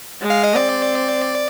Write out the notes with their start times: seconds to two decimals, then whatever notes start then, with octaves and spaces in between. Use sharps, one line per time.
0.22 G#3
0.30 F5
0.44 D#5
0.55 C4 D5